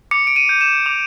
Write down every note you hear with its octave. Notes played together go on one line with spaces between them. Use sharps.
D6 C#7
D7
D#7
G6
E7
D6 F7